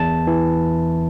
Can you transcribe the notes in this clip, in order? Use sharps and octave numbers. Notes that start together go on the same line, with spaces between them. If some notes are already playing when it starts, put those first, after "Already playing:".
Already playing: E2 A5
E3